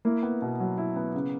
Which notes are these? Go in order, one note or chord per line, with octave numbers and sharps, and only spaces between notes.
A#3 E4
B3
B2
F#3
E4
B3
C#3